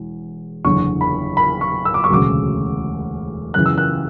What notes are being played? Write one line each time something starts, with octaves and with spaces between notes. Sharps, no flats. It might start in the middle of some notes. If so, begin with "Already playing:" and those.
Already playing: E1 E2
F#1 E2 D3 C#6
B5
B5
C#6
E6
D6
C#6
E1 D2 C#3 F#3 D6
F#2 C#3 E3 F#6
E6
F#6